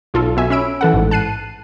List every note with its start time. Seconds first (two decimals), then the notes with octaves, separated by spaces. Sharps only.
0.14 B1 F4 A4
0.37 B2 E5 G#5
0.50 C#4 B5 E6 D7
0.81 E3 A4 F#5
0.94 A1 G#2
1.11 A5 F#6 C7 D#7